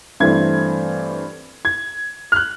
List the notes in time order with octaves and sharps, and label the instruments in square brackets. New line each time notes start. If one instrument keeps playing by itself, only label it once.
[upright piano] G2 E3 A3 C4 G#6
G#6
F6
F#6